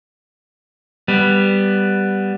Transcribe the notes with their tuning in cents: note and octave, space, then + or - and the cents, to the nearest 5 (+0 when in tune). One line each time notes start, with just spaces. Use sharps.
G3 +0 B3 +0